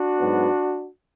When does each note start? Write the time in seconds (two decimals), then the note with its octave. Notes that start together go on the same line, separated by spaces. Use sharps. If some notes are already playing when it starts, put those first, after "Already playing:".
Already playing: D4 F#4
0.19 G#2 F#3 B3